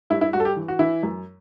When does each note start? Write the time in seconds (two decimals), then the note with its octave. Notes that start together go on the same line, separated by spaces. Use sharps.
0.10 G2 E4
0.21 E4
0.33 G2 F#4
0.40 A4
0.45 G4
0.56 E3
0.68 F#4
0.79 E3 E4
1.03 F#2